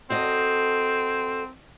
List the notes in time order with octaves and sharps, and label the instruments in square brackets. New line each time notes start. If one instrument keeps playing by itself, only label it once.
[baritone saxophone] C4 [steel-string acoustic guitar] F#4 A4 D#5